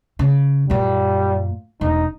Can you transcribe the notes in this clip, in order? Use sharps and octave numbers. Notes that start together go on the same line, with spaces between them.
C#3
F#2 A#2 G3
E1 D#4